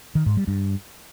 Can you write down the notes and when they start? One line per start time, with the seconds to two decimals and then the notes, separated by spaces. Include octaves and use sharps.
0.15 D#3
0.26 G#2
0.37 G3
0.48 G2